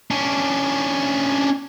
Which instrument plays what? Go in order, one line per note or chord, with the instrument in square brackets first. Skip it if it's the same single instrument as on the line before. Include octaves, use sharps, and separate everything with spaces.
[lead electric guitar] C#4 D4